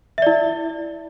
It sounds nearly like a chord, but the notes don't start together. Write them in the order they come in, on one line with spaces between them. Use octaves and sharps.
E5 D5 E4